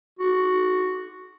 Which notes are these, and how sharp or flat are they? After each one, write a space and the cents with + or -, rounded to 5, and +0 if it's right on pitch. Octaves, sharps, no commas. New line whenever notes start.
F#4 +0